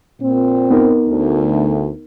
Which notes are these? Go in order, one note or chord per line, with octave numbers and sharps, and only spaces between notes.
A#2 C4
B3 D#4 A#4
D2